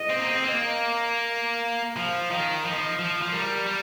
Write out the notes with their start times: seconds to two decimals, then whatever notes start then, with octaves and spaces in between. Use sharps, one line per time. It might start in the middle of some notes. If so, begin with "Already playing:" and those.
Already playing: D#5
0.10 C4
0.19 A#3
0.28 C4
0.44 A#3
1.97 F3 F5
2.31 D#3 F5
2.65 F3 D#5
2.99 F3
3.22 F3
3.32 G3 A#4
3.67 G3